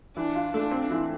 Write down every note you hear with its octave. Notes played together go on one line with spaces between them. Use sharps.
E3 D4
F4
A3 D4
C4
E3